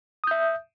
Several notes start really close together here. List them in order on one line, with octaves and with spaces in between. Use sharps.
D#6 G6 E5